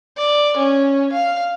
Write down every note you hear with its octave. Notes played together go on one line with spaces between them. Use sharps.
D5
C#4
F5